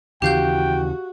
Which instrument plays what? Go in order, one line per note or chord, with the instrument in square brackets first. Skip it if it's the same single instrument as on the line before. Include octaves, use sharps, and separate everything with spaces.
[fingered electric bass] D#2 C#3 E3 [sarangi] F#4 [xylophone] G4 F5 G6 [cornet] G5